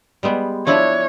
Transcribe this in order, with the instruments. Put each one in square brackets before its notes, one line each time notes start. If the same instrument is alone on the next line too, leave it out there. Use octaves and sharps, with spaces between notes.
[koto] G3 G#3 B3
[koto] F3 D4 E4 [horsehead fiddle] C#5